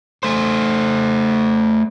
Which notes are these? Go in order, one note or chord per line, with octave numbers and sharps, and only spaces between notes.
A3 C5